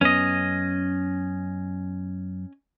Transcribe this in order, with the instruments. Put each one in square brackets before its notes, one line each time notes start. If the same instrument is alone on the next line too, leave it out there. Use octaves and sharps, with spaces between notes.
[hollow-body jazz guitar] F#2 B3 [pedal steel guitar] C#4 D#5